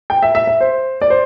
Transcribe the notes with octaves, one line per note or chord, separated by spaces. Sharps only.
G5
E5
E5
E5
C5
D5
C5